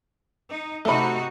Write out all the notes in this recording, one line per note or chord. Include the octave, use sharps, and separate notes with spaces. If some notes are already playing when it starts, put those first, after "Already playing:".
D#4
C3 A3 D#4 F#4 B5